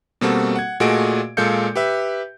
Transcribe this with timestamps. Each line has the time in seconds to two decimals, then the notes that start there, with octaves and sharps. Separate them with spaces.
0.21 B2 G3 A#3 C4 F#4 A4
0.56 F#5 G#6
0.80 A#2 A3 F#4 G#4 D#5 D7
1.37 A#2 G#3 A4 F5 G6 C#7
1.76 G4 B4 E5